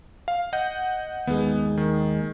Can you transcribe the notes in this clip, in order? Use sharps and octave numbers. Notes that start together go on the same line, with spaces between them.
F5
D#5 F#5 G6
D#2 G#3 B3
D#3